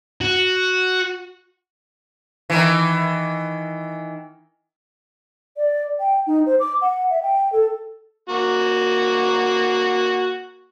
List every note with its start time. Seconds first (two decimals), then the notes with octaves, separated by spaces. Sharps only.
0.21 F#4
2.50 D#3 E3
5.57 D5
6.00 G5
6.27 D#4
6.46 C5
6.60 D6
6.81 F#5
7.10 E5
7.23 G5
7.52 A4
8.29 A#3 F#4